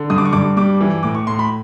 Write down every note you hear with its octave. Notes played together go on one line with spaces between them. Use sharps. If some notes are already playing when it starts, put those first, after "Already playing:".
Already playing: D3
G2 D#6
D6
C#6
G2 D6
G3 D6
E3
A2 D6
C#6
A2 C6
B5